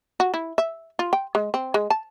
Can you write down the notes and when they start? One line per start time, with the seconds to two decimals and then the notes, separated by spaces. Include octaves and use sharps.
0.20 F#4
0.34 E4
0.58 E5
0.99 F4
1.13 G5
1.35 G#3
1.54 C4
1.74 G#3
1.90 A5